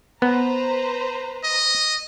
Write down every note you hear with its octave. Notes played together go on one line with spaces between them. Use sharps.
B3 B4 C5 A#5
D#5